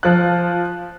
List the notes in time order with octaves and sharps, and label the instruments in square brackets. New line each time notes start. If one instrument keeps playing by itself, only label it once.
[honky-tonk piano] F3 F#6